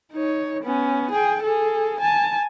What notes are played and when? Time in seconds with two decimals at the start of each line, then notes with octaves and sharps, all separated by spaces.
0.12 D#4 C#5
0.63 B3 C#4
1.11 G#4 G5
1.43 G#4 A4
2.00 G#5 A5